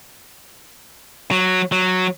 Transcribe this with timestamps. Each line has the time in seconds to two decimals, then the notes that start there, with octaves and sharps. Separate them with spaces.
1.31 F#3
1.72 F#3